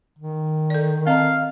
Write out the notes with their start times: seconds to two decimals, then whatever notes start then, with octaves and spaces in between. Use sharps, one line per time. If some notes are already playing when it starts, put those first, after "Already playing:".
0.19 D#3
0.70 A4 D5
1.07 C4 D#5 F5 A#5